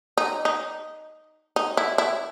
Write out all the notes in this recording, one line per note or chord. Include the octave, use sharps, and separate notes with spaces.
D#4
D#4
D#4
E4
E4